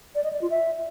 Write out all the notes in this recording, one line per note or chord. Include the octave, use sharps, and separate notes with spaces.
D5
D#5
D5
F4
E5